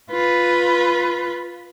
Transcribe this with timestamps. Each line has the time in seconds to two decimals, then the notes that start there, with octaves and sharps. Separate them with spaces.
0.11 F4 B4